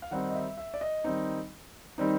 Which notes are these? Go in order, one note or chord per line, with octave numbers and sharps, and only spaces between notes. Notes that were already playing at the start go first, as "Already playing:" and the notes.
F5
D#3 G3 C4 D#4 F#5
D#5
E5
E5
D5
D#5
D#3 G3 C4 D#4
D#3 G3 C4 D#4